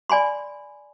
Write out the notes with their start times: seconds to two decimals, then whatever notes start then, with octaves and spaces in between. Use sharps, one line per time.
0.10 D5 G#5 B5 C6